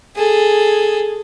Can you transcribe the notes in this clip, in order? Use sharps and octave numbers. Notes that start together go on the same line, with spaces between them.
G#4 A4